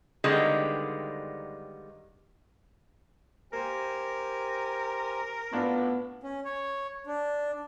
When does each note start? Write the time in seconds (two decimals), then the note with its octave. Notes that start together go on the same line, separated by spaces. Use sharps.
0.24 D3 D#3 G3 G#3 A#3 B3
3.53 A#3 G4 A#4 C5 G#5
5.53 A2 B3 D4 F4
6.23 C#4
6.45 C#5
7.07 D4